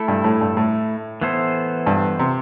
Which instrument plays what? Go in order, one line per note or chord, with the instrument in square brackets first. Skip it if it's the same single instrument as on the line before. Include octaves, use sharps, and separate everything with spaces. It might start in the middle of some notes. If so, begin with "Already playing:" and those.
Already playing: [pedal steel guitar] A3 E4 A4
[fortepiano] G2
A2
G2
A2
[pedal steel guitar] E3 B3 E4 A4 C5
[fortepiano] G2
C3